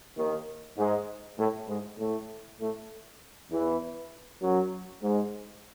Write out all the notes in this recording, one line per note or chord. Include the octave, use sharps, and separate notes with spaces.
D#2 D#3
G#2 G#3
A2 A3
G#2 G#3
A2 A3
A2 A3
E2 E3
F#2 F#3
G#2 G#3